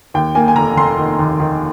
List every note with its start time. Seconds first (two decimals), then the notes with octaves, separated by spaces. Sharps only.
0.14 D#2 G5
0.35 A#3 G#5
0.48 G#5
0.56 F1 A#5
0.77 F1 C6
0.98 D#3
1.19 D#2
1.40 D#3